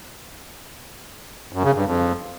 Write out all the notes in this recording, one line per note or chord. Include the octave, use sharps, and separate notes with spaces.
F#2
C#3
G2
F2